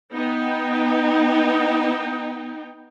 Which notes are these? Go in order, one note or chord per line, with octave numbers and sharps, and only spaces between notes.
B3 D#4 G5